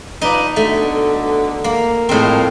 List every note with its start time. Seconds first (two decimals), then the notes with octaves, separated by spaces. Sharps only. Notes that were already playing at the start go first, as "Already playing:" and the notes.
0.22 F3 D#4 B4 D5
0.56 B2 D3 A3
1.64 A#3
2.09 F2 A2 G#3 C4 A#4